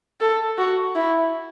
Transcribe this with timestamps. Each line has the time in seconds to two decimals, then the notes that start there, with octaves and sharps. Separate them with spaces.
0.20 A4
0.58 F#4
0.95 E4